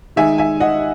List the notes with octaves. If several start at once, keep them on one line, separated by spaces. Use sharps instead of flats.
D#3 G#3 D#4 E5 G#5
E5 G#5
D#5 F#5